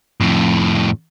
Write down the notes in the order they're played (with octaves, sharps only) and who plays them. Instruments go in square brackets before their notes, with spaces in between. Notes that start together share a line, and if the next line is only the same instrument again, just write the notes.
[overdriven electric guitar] F2 A2